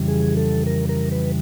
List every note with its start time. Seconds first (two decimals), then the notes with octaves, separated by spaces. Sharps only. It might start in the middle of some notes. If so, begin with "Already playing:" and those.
Already playing: F2 C#3 E3 G3
0.08 G#4
0.37 A4
0.66 A#4
0.89 A#4
1.12 B4